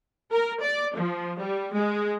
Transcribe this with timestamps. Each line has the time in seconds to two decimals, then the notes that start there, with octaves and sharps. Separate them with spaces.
0.32 A#4
0.61 D5
0.95 F3
1.38 G3
1.74 G#3